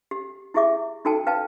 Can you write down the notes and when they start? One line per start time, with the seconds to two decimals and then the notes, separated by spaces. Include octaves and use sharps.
0.11 G4
0.54 E4 G4 G#4 E5 D6
1.05 D#4 F#4 A4 G5 A5
1.27 B4 F5 G5 A5